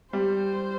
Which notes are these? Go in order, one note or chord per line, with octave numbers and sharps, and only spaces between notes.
G3 C5